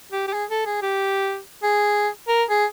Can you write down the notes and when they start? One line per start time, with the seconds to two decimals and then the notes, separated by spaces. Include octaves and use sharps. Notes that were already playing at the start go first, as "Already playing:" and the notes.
0.12 G4
0.28 G4
0.33 G#4
0.50 A4
0.66 G#4
0.82 G4
1.63 G#4
2.28 A#4
2.50 G#4